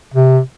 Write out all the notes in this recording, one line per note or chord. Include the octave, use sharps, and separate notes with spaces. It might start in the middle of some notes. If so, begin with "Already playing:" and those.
C3